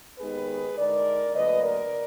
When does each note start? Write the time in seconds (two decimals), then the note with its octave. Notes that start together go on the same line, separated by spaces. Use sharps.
0.19 D#2 D#3 G#3 B3 D#4 G#4 B4
0.77 D3 G#3 D#4 A#4 D5
1.34 D2 D3 F#3 A#3 B4 D#5
1.63 A#4 D5